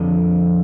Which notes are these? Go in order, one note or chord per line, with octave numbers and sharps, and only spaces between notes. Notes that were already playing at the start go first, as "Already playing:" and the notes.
Already playing: F2 D3